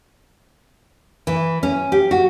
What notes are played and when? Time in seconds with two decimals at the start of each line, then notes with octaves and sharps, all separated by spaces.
1.27 E3
1.63 C#4
1.92 G4
2.11 F#4